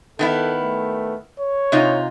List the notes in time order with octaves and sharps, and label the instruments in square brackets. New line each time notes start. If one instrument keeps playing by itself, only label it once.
[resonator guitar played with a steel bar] D#3 B3 E4 [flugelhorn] A4
[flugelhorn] A3
C#5
[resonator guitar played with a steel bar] C3 D#4 F4